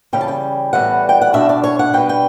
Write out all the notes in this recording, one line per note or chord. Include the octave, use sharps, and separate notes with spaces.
C#3 E3 G3 C#4 G5
A5
G5
A2 E3 G3 B3 F#5
G5
F#5
B2 A3 D4 E5
D5
C#5
F#5
B2 G3 B3 G5
G5